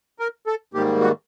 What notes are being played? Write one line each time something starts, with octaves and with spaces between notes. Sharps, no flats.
A#4
A4
G#2 D#3 G3 A#3 G4
F#4